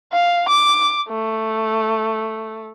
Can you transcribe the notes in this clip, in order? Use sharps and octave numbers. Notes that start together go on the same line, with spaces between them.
F5
D6
A3